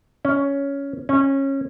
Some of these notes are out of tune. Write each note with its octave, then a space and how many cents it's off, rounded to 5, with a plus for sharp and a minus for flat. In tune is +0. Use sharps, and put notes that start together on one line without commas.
C#4 +10
C#4 -20